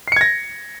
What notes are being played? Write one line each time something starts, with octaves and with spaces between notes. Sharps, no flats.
G#6 A#6 C7 C#7